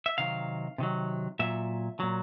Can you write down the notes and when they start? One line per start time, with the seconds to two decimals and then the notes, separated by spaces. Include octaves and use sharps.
0.06 E5
0.18 C3 D#3 F#3 F5
0.78 C3 D#3 F#3
1.39 A#2 F#3 E5
2.00 A#2 F#3